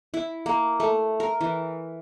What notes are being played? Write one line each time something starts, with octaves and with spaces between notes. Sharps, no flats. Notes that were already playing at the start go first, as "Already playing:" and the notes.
E4
A#3
A3
A#4
E3